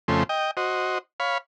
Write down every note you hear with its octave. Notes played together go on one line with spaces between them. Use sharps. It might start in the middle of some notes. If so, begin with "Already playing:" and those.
F2 C#3 A3 C5
D#5 G5
F#4 C5 D#5
C#5 F5 B5